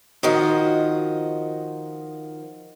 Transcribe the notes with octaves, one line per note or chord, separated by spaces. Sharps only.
D#3 F3 F#4 D#5